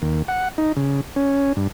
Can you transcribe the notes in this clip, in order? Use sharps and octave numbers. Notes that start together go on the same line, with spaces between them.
D#2
F#5
D#4
C#3
C#4
G2